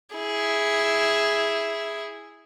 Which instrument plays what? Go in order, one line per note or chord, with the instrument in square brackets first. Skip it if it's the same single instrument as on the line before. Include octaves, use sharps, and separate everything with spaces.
[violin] E4 G#4